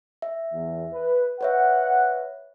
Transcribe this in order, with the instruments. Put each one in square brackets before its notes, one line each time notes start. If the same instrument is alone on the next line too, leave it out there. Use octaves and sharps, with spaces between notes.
[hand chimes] E5
[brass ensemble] E2
B4
[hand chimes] B4 C#5 E5 [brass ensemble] F#5